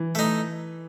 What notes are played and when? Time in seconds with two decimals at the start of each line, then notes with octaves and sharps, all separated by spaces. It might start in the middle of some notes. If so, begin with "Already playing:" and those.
Already playing: E3
0.15 A3 D#4